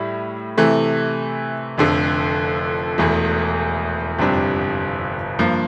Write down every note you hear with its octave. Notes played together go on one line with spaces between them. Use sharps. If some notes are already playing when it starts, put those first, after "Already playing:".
Already playing: A2 G3 E4
C3 E3 A3
F1 F2 D3
E1 E2 E3 A3
G1 F2 C3 G3 D4
G2 F3 A#3